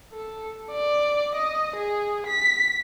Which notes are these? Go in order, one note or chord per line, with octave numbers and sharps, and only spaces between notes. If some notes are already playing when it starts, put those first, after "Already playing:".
A4
D5
D#5
G#4
B6